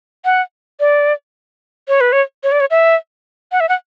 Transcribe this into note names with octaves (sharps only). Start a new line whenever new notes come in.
F#5
D5
C#5
B4
C#5
C#5
D5
C#5
E5
F#5
E5
F#5